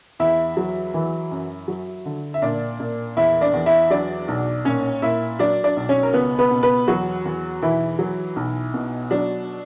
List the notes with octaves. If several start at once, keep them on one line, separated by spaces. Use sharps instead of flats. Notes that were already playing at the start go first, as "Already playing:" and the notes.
E2 E4 E5
F#3
E3
F#2
F#3
D3
E5
A#2 D4 D5
A#2
E2 E4 E5
D4 D5
E2
E4 E5
F#3 D4 D5
B1
A#2 C#4 C#5
A#2 E4 E5
F#3 D4 D5
D4 D5
B1
C#4 C#5
A#4
C#2 B3 B4
B3 B4
B2
B3 B4
E2 F#3 F#4
E2
B1 E3 E4
F#3
B1
B2
F#3 D4